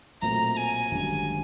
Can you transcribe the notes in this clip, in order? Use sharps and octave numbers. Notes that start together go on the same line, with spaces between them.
B1 A#2 F#3 A3 C4 A#5
G#5
G#1 F#2 D3 G3